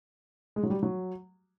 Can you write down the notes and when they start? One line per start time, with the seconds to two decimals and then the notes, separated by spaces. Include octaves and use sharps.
0.56 G#3
0.63 F#3
0.70 G3
0.83 F#3